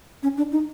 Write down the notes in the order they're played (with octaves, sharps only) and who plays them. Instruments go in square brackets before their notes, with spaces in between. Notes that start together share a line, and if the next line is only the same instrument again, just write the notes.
[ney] C#4
D4
D#4